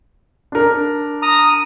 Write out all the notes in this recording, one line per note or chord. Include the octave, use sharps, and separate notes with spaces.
D4 A#4
A#5 D#6